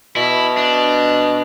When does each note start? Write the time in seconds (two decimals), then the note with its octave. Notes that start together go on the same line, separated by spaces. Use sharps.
0.16 B2 E4
0.57 D4